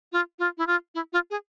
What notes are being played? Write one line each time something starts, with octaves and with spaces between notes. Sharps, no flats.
F4
F4
E4
F4
E4
F4
G#4